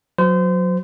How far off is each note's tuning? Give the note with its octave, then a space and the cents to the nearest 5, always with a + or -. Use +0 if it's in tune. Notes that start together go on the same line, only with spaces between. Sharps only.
F#3 -20 C5 -30